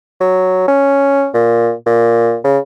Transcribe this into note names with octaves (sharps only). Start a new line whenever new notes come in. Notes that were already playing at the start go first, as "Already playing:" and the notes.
F#3
C#4
A#2
A#2
C#3